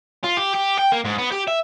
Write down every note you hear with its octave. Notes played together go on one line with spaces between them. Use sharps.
F4
G4
G4
G5
A#3
G#2
B3
G4
E5